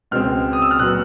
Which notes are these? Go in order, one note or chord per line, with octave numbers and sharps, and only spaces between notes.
C#2 B2 G#3 C4 F6
D#6
E6
F6
A#2 F#3 B3 F#6